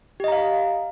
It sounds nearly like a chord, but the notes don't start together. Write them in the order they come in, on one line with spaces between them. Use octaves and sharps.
G4 D#5 A#5 F5